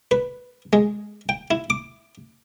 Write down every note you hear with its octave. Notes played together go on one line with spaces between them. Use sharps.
B4
G#3
G5
E4
D6